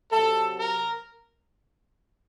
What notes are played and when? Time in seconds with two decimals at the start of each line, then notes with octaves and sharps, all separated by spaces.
0.11 C3 F#3 A4
0.58 A#4